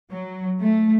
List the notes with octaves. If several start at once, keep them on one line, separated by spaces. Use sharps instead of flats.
F#3
A3